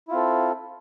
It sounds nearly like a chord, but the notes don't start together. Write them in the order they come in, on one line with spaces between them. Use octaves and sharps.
E4 F4 C4 A4